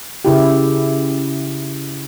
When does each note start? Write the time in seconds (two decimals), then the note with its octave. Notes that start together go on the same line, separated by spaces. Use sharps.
0.25 C#3 E4 G4